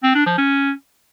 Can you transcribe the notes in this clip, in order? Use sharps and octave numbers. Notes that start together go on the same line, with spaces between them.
C4
D4
F3
C#4